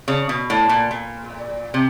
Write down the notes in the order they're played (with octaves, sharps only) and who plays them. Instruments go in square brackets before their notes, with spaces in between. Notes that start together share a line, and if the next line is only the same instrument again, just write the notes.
[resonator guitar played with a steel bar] C#3
B2
A2
A#2
A#2
C3